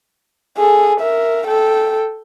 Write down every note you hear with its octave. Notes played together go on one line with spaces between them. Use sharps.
G#4 A4
A#4 E5
A4 G5